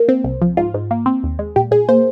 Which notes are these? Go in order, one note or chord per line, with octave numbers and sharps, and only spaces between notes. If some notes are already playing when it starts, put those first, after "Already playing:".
Already playing: A#3
C4
C2
F3
G#2 F4
G#2
A#3
C4
D#2
G#3
A#2 G4
A#2 G#4
A#3 C5